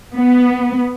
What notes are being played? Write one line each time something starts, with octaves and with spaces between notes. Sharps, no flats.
B3